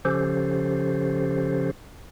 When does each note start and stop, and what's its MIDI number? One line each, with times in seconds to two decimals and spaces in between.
0.05 1.71 49
0.05 1.71 53
0.05 1.71 61
0.05 1.71 67
0.05 1.71 69
0.05 1.71 72